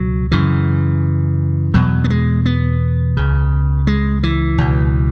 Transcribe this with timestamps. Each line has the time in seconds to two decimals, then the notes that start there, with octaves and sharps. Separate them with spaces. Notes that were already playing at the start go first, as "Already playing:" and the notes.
Already playing: C#2 B2 F#3
0.32 F#2 C#3 E3
1.74 E2 B2 F#3
2.04 B3
2.10 G#3
2.46 B3
3.17 C#2 C#3
3.87 G#3
4.23 E3
4.58 C#2 B2